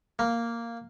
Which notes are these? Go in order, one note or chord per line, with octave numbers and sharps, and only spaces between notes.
A#3